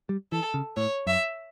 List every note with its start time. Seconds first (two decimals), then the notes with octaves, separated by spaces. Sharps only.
0.09 G3
0.32 E3 A4
0.54 C#3
0.76 A2 C#5
1.06 F#2 E5